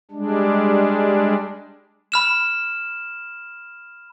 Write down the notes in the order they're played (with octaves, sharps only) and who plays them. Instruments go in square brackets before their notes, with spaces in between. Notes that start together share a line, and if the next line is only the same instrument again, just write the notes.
[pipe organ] G3 G#3 D4
[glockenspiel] B5 F6 E7